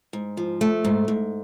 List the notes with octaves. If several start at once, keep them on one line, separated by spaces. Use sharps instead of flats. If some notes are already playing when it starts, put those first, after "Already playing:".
G#2
F3
A3
G#2
G#2